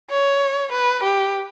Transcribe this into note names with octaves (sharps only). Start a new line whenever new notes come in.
C#5
B4
G4